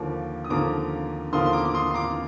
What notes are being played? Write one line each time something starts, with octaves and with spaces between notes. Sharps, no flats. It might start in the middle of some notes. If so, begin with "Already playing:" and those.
Already playing: D#2 D3 F3 A#3 D6
D#6
D#2 D3 F3 A#3 A#5 D6
D#2 D3 F3 A#3 C6 D#6
C6
A#5 D6
D6
C6 D#6
C6
A#5 D6